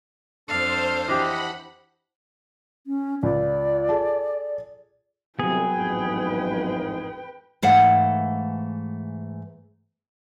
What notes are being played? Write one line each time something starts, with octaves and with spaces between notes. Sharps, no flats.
F2 D4 A4 C5 F5
E3 D4 G4 D#5 F#5 B5
C#4
C#2 D5
G#4 A4 A5
C2 F#3 B3 G#4 B4 G5
A1 F2 G#2
G#2 E3 A3 F5 F#5